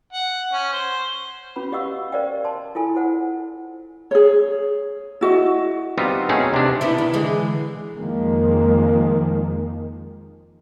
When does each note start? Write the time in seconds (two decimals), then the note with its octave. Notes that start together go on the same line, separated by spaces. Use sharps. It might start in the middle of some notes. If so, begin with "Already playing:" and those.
0.12 F#5
0.53 C#4
0.72 C5
1.56 C#4 F#4 B4 B5
1.72 G4 D#5 F5 F#5 C#6 E6
2.12 A#4 C5 D5 D#5 F5 G5
2.45 A5 C6
2.75 E4 F4 A4 G#5
2.96 C5 F#5
4.11 G#4 C#5
5.21 E4 F#4 D#5
5.98 G3 B3 C4 D#4 F4
6.29 B2 A3 C4 C#4 D#4 G#4
6.54 C3 D4
6.81 B3 D4 E4
6.98 D#3
7.13 D3 E3 G#3
7.96 F2 D#3 F3 G#3 A#3